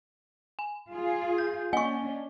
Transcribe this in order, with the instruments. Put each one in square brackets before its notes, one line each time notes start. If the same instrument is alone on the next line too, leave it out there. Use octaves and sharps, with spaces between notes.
[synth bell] G#5
[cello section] F4 G#4
[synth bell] G6
[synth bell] A#3 D#5 G7 [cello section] C#4 D4 [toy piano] G#5 C#6